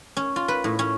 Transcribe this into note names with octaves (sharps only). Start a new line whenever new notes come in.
C#4
F4
B4
A2
C#4